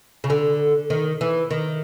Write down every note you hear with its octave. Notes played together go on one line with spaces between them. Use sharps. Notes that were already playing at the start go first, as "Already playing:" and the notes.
C#3
D3
D#3
E3
D#3